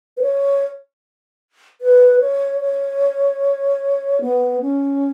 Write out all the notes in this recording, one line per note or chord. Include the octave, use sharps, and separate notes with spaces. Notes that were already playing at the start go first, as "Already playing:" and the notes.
B4
C#5
B4
C#5
C#5
B3
C#4